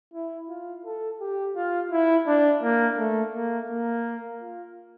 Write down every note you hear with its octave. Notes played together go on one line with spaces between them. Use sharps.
E4
F4
A4
G4
F4
E4
D4
A#3
A3
A#3
A#3
F4